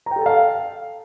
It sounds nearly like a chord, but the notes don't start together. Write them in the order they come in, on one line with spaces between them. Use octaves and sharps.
A#5 G5 A4 A5 F5